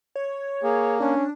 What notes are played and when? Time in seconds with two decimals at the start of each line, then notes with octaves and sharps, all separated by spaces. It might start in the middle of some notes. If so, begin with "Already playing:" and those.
0.16 C#5
0.63 A#3 G#4
1.00 C#4 D4